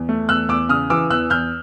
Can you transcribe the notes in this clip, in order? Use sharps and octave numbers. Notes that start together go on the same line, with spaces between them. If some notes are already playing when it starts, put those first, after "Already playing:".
Already playing: E2
A3
E2 E6 F#6
E2 D6 E6
C#3 D#6 F6
E3 D6 E6
E2 E6 F#6
E2 F6 G6